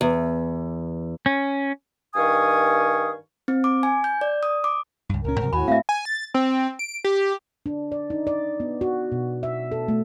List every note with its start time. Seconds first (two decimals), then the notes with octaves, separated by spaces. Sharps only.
0.01 E2
1.26 C#4
2.15 G2 D#3 F5 G#5 C#6 D#6
3.48 C4
3.64 D6
3.83 G#5
4.04 G6
4.21 D5
4.43 D#6
4.64 D6
5.09 C#2 G2
5.24 C#2 A#2 C#4 A#4
5.41 G#2 C3 F#3
5.53 D#2 A2 F#4 G#5 B5
5.68 A3 C4 E5 F5
5.89 G#5
6.05 A6
6.34 C4
6.79 D7
7.04 G4
7.66 D4
7.92 D5
8.10 D#4
8.27 D5
8.60 B3
8.81 F#4
9.12 B2
9.43 E5
9.71 A4
9.88 A3